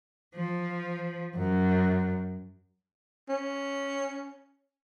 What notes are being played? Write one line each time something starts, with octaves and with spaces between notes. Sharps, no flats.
F3
F#2
C#4